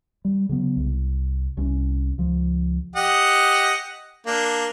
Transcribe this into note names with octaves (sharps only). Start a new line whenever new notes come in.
G3
C#3 F#3 B3
C2
C2 C#4
C#2 F3
G4 D#5 F#5
A#3 D4